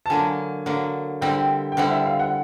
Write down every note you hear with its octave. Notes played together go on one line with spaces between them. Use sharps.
A5
D3 F#3 A#3 G#5
D3 F#3 A#3
D3 G3 C4 E4 G5
G5
D3 G3 C4 E4 F#5
E5
F5
F#5